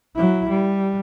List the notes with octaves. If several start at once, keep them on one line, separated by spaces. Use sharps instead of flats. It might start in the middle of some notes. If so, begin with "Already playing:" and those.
F#3 E4
G3